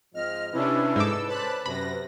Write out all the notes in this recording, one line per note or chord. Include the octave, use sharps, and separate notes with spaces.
G#2 F3 C4 D#5 F6
C3 C#4 D4 E4 B4
G#2 A4 D6 E6
C#4 B4 C5 D5 A5 B5 F#6
F#2 C3 B5 A#6